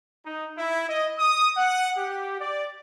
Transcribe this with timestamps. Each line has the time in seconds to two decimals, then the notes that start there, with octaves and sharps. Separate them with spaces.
0.26 D#4
0.58 E4
0.89 D#5
1.19 D#6
1.57 F#5
1.98 G4
2.41 D5